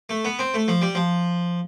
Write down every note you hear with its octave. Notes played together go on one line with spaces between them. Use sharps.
A3
B3
C4
A3
F3
G3
F3